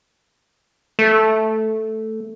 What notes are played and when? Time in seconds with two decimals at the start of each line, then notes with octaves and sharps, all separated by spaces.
0.99 A3